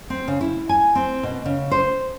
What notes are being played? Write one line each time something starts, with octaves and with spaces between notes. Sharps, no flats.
C4
C#3
E4
G#5
C4
B2
C#3
C5